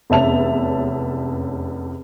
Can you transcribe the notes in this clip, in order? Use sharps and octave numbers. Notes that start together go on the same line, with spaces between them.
F1 E2 C#4 E5 A5 F7